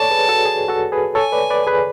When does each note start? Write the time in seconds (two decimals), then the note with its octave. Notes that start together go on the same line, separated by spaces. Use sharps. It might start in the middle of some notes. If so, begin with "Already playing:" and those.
Already playing: A4 C#5 D5 A5
0.11 G#4 B4
0.29 F#4 A4
0.46 G#4
0.68 F#4 A4
0.92 G#4 B4
1.15 A4 C#5 G#5
1.32 B4 D5
1.50 B4 D5
1.67 G#4 B4